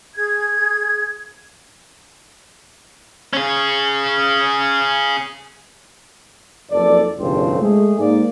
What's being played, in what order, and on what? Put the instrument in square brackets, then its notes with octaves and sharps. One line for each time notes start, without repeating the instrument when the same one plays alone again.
[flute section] G#4 G#6
[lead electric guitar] C#4 G#4
[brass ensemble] F#1 F2 A4 D5
G1 C2 A2 C#3 F3 C4
G#3 A3 G#4
G#2 A#3 D5